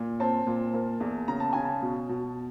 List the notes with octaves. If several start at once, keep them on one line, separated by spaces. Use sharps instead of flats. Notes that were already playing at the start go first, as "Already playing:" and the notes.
Already playing: A#2
C4 A5
A#2
A#3
E2
C#3 A#5
A5
C#3 G#5
A5
B2
B2